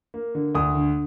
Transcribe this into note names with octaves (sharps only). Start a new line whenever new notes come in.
A#3
D3
D2 D#6
D3